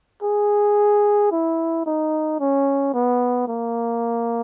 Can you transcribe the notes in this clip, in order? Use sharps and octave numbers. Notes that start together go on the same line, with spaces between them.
G#4
E4
D#4
C#4
B3
A#3